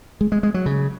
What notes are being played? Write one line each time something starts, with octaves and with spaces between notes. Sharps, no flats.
G#3
G#3
G#3
F#3
C#3